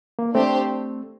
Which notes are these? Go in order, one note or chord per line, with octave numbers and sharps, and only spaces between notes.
A#3
A3 C4 D4 G4 C5